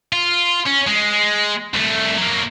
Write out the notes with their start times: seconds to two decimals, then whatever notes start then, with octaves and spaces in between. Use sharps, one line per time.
0.12 F4
0.67 C#4
0.88 G#3
1.74 C2 A3
2.18 F#3 A#3